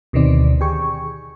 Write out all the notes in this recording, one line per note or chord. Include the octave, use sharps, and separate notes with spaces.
D2 B2 D3 D#3 C4 D5
G4 G#4 C#6